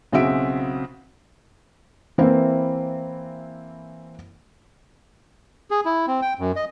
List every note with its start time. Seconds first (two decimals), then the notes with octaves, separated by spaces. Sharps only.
0.12 B1 C#3 C4 F#4 E5 D7
2.18 E3 A#3 C4 E4
5.71 G#4
5.85 E4
6.07 C4
6.22 G5
6.39 F#2
6.56 D#5